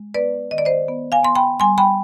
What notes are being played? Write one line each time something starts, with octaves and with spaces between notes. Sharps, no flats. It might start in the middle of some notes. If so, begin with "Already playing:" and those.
Already playing: G#3
B3 B4 D5
D#3 D#5
D5
C5 D#5
B3
F5 G#5
B3 C6
G5 B5
G3 G#5 C6
G5 B5